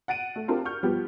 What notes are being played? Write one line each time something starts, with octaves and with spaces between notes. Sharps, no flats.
F#5 A6 D7 D#7
A3
C4 D4 F4 G4 A#4 A5
C#6 F6 G6
F3 G3 B3 G4